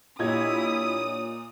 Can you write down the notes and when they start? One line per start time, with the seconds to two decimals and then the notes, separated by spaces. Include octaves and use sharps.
0.19 A#2 D4 E4 G4 C#5 D#5 D#6 G#6